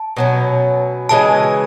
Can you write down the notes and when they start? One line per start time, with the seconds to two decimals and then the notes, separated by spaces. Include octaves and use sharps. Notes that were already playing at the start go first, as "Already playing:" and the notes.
Already playing: A5
0.17 B2 F#3 C#4
1.09 C#3 E3 G#3 A5